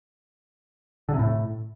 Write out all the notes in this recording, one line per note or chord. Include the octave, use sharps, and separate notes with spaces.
D3
C3
A2